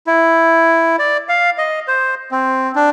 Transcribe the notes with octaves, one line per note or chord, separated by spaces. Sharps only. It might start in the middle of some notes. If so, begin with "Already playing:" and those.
E4
D5
F5
D#5
C5
C4
D4